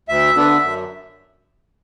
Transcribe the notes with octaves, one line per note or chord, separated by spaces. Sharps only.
D2 E5
D3 B3 D4
F#2